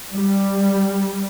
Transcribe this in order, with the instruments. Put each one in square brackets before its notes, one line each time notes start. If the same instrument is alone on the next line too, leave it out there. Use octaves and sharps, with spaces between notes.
[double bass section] G3